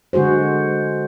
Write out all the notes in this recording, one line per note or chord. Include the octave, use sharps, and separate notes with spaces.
D3 G#3 F#4 G#4 C5